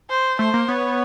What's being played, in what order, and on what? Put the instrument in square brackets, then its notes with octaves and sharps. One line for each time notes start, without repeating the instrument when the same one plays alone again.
[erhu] C5
[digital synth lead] A3 [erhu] C5
[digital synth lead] A#3
[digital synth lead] B3 [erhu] C#5